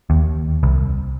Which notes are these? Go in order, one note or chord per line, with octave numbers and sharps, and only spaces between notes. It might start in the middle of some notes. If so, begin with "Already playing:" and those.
D#2
C2